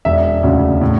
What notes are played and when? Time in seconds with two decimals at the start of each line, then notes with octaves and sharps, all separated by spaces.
0.05 E1 E5
0.43 D2 C#3
0.81 A2